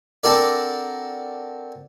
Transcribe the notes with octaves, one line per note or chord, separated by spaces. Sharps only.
C4 D4 F#4 A4 A#4 D5